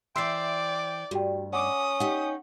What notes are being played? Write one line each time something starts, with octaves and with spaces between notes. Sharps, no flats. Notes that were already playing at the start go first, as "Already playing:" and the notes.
E3 C5 D5 E5 G5 C6 E6 C7
D2 G2 F#4 G4 G5
C#4 F#5 G#5 D6 D#6
D#4 G4 F#5